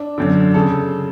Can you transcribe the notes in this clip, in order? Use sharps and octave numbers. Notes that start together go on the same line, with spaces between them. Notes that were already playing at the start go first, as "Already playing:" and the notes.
Already playing: D4
F#2 D3
C#3 A4